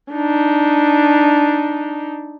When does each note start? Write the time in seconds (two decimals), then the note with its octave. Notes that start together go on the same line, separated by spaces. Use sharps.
0.12 D4 D#4